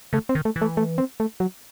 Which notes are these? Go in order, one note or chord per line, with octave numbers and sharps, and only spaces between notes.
C#3 A3
C4
D#3
A3
E3
A3
A3
C4
A3
F#3